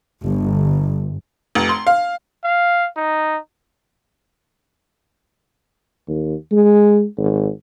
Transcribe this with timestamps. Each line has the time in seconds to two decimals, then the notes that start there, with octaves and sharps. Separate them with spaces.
0.23 G1
1.55 F1
1.69 C6
1.87 F5
2.44 F5
2.97 D#4
6.07 D#2
6.52 G#3
7.17 G#1